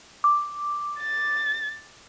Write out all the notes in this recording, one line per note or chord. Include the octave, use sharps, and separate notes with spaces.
D6
A6